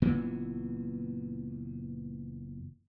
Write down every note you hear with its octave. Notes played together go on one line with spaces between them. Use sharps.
F#1 A#2 E3 B3